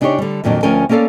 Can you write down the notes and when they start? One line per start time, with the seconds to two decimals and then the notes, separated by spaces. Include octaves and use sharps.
0.01 C#3 D4 D#4 F#4 G4 C#5
0.18 D3 G3
0.44 F2 A#2 D#3 F#3 D4
0.63 D2 F3 C#4 A#4 G5 G#5
0.89 A#3 C#4 G#4 A4 D5 F5